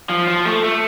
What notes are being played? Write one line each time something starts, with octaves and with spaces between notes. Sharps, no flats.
F3
F3
A3
A3